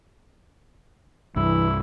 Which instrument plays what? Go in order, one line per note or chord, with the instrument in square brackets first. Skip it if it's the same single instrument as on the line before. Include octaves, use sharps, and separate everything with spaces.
[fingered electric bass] C2 G2 [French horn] E3 [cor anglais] E4